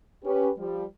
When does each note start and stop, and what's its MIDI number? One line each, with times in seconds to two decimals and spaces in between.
0.23 0.50 61
0.23 0.50 67
0.23 0.50 71
0.57 0.83 53
0.57 0.83 55